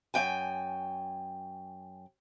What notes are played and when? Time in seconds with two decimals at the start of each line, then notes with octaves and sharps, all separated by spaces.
0.14 F#2 A#3 G5 G#5